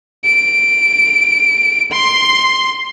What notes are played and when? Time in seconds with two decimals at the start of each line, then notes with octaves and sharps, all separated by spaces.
0.25 D7
1.92 C6